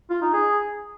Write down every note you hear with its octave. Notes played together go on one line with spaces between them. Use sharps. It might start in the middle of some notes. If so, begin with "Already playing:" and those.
F4
D#4
G#4